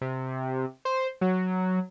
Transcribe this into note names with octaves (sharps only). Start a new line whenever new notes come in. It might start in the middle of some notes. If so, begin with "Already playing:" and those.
C3
C5
F#3